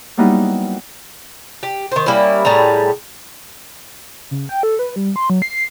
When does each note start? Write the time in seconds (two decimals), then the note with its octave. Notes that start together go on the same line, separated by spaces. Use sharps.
0.17 F#3 G3 A#3 B3 D#4 E4
1.63 G4
1.91 D#3 C5
2.06 G3 A#3 C#4 E4
2.45 A2 G3 G#4 A#5
4.31 C#3
4.49 G5
4.63 A4
4.79 B4
4.96 G3
5.16 C6
5.30 F#3
5.42 C7